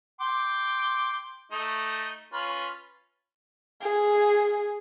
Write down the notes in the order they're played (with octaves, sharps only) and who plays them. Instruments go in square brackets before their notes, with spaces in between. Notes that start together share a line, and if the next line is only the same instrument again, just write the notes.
[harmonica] G5 C6 D6
A3 D#4
C#4 F4 B4
[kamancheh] G#4